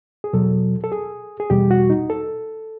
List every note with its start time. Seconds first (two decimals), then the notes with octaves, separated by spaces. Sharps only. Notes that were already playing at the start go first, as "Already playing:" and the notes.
0.24 G#4
0.33 E2 B2 F#3 A4
0.84 A4
0.92 G#4
1.40 G#4
1.50 E2 B2 G3 G4
1.71 F#4
1.90 D#4
2.10 A4